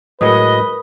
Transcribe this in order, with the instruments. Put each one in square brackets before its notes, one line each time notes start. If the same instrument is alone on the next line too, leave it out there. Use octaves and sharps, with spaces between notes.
[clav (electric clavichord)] A2 F#3 G#3 [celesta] A#4 B5 D#6 [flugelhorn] B4 [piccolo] D#5